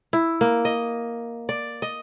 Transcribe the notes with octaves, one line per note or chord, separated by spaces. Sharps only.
E4
A#3
D#5
D5
D#5